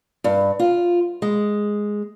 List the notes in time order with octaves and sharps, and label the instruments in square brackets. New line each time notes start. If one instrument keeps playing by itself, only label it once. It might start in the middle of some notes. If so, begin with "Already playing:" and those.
[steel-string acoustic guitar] G2
F4
G#3